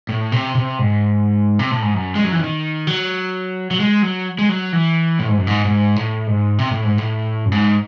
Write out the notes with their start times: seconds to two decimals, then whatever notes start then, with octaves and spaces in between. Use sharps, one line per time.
0.09 A2
0.32 C3
0.55 C3
0.79 G#2
1.59 C3
1.71 A2
1.82 G#2
1.94 F#2
2.15 G#3
2.24 F#3
2.32 E3
2.41 D#3
2.87 F#3
3.71 F#3
3.80 G#3
4.03 F#3
4.39 G#3
4.49 F#3
4.73 E3
5.19 A2
5.28 G#2
5.38 F#2
5.47 G#2
5.65 G#2
5.96 A2
6.27 G#2
6.59 C3
6.71 A2
6.84 G#2
6.98 A2
7.45 F#2
7.52 G#2